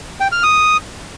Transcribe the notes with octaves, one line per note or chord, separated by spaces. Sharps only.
G5
F6
D#6